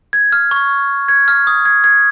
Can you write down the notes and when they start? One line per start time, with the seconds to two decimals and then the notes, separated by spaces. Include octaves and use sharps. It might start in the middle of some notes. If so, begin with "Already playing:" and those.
0.13 G#6
0.32 F6
0.51 C#6
1.08 G#6
1.28 F6
1.47 D#6
1.65 G#6
1.84 G#6